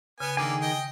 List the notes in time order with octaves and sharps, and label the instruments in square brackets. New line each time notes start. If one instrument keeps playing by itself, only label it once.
[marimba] C#3 G#6 [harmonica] B3 G#5
[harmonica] D3 A#3 [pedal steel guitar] D#3 G#4 G#5
[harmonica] D#5 G5